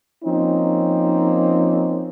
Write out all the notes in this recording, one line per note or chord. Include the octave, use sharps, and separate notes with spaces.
F3 A#3 C4 C#4 D#4